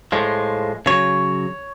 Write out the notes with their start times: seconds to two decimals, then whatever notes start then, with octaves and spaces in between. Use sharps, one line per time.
0.12 A2 F3 G#3
0.86 C#3 F#3 C#5